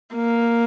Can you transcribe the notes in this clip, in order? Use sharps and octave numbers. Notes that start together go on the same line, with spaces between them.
A#3